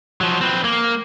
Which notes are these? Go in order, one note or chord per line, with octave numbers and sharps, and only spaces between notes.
F3 F#3
C4 B4
A#3